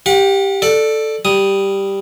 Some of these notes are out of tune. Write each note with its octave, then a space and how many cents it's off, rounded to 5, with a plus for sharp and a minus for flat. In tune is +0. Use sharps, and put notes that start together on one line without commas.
G4 +0 F#5 -40
A4 +0 D5 +15
G3 +0 D#6 +0